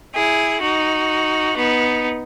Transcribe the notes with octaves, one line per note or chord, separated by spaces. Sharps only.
E4 G#4
D#4 F#4
B3 D#4